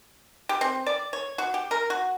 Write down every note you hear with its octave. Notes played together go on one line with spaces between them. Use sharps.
G4
C4
D5
C#5
F#4
G4
A#4
F#4